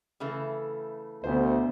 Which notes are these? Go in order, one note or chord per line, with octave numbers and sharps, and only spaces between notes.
C#3 E3 A3
D2 B2 C5